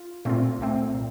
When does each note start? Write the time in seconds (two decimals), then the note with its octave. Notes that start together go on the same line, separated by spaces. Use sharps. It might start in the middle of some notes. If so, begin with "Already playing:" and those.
Already playing: F4
0.25 A#2 A3 C4 F4
0.59 C2 A#2 A3 C4
0.94 A#2